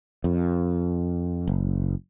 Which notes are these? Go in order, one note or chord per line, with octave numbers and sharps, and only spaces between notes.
F2
F#1